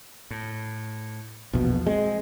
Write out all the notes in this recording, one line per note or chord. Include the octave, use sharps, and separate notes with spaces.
A2
A#1 E2 B2 F3
G#3 C4